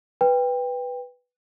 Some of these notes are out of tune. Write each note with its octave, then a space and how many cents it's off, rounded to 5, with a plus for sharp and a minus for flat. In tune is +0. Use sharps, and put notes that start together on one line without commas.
B4 +0 G5 +20